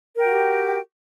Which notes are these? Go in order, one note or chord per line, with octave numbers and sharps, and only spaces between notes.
F#4 G4 A#4 G5